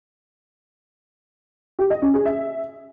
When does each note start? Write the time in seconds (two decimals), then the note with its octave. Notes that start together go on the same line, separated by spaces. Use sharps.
1.79 G4
1.90 D#5
2.02 C#4
2.14 G#4
2.25 E5